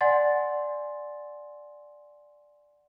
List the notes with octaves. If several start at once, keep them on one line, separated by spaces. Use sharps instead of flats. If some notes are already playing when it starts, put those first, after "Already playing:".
D5 F#5 G#5 C6 A6